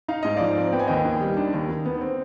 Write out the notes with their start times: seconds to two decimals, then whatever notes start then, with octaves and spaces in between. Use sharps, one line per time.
0.08 D#4 F5
0.23 G#2 D#5
0.36 F3 D5 F5
0.56 C4
0.72 B3 G5
0.79 G#5
0.88 D#2 D#5 G5
1.05 D#3
1.21 G3
1.37 D4
1.54 D#2
1.69 D#3
1.86 B3
2.01 C4